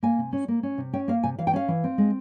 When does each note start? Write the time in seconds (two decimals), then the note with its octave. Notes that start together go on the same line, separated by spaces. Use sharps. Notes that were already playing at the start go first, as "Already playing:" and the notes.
0.03 A#3 G#5
0.18 C3
0.33 C#4
0.48 A#3
0.63 C#4
0.78 C3
0.93 C#4 G5
1.08 A#3 F5
1.23 C3 G#5
1.39 E3 F5
1.47 G5
1.53 C#4 F5
1.68 E3
1.84 C4
1.98 G#3